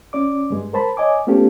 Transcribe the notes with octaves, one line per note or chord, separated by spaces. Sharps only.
C#4 D5 D6
G2 G#3
A#4 C5 A5 B5
C#5 D#5 G#5 D6
A3 B3 C#4 F4 G4 A4